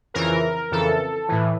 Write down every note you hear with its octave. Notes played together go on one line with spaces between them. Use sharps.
F2 C#3 E3 A#4
F2 C#3 E3 A4
A2 E3